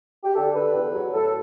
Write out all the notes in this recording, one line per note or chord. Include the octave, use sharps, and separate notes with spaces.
G4
D3 A4
D3 B4
E2
F#3
A2 A4